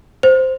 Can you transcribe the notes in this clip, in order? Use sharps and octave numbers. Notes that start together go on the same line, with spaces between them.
C5